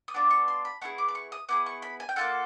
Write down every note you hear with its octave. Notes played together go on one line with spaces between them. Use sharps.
D#6
B3 D4 F4 D6
C#6
C6
B5
B3 E4 G#4 C#6
D6
D6
C#6
D#6
B3 E4 G#4 D6
C#6
B5
G#5
G5
A#3 D4 F4 A4 F#5